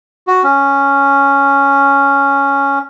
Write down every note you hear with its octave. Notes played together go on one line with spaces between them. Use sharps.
F#4
C#4